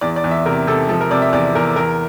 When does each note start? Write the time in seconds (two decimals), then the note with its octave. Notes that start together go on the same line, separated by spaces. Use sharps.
0.01 E2 D5
0.16 D5
0.24 E2
0.31 E5
0.46 C3 A#4
0.67 C3 A4
0.89 F3 A4
1.01 A#4
1.11 C3 D5
1.22 E5
1.33 E2 D5
1.55 E2 A#4
1.76 E2 A#4